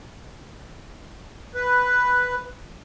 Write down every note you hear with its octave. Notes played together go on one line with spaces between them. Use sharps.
B4